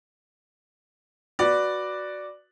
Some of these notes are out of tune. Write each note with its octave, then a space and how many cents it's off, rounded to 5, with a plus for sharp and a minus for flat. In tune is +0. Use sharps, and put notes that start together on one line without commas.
F#4 +0 B4 +0 D5 +0